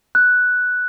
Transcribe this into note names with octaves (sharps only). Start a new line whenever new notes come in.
F#6